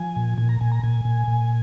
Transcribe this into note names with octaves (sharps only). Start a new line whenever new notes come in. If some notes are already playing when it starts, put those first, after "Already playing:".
Already playing: F3 G#5
A#2
A#2 G#5
A#5
A#2 G#5
A#5
A#2 G#5
A#2
A#2